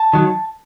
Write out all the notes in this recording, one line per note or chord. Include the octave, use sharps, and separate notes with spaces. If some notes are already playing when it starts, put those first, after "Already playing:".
Already playing: A5
D#3 F#3